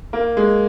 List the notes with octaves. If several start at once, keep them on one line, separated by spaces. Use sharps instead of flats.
A#3
G#3